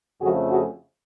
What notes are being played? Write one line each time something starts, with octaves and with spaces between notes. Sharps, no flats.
F2 C#3 F3 A3 F#4 G#4
F#4 G#4